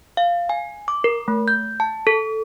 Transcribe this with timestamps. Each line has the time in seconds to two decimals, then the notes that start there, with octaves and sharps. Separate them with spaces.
0.17 F5
0.49 G#5
0.88 D6
1.04 A#4
1.28 A3
1.48 G6
1.80 A5
2.07 A4